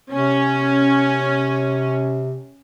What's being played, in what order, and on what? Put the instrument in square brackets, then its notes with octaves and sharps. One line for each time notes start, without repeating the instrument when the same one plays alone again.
[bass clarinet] C3 [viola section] C#4